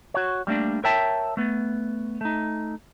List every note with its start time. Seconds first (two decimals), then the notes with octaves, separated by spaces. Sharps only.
0.14 F#4 C#5
0.47 G3 A3 A#3 D4
0.84 A#4 C#5 E5 G5 A5
1.37 A3 B3
2.21 A3 D#4